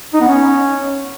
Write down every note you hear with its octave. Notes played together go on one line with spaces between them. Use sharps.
D#4
B3
C#4